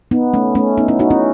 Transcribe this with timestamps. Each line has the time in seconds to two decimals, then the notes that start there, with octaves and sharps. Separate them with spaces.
0.11 B3 D#4
0.33 A3 C#4
0.55 A3 C#4
0.77 B3 D#4
0.88 C#4 E4
0.99 D#4 F#4
1.11 C#4 E4